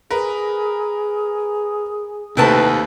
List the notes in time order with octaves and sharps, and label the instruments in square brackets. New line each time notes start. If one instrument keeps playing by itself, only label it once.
[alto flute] G#4 [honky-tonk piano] A#4 B4
[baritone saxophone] D#2 [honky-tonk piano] C3 A3 C4 [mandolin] E4 B4 A5